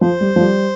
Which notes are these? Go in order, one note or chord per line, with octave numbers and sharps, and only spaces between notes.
F3 C5
G3
F3
G3